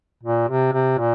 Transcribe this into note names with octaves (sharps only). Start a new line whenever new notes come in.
A#2
C3
C3
A#2